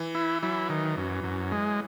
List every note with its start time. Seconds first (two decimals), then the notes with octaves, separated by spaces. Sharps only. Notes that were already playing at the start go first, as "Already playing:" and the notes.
Already playing: E3
0.15 E4
0.43 F#3 E4
0.70 D#3
0.97 F#2
1.24 F#2
1.52 G#3